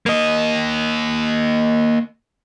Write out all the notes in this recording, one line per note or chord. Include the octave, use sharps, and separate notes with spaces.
A#3 D#5